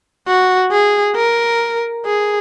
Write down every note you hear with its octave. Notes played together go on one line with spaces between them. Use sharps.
F#4
G#4
A#4
G#4